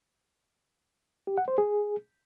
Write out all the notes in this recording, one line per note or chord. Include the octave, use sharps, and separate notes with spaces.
G4
F#5
C5
G#4